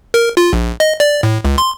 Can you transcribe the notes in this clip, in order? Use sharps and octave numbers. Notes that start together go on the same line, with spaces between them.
A#4
F4
A#1
D#5
D5
A2
C#2
C6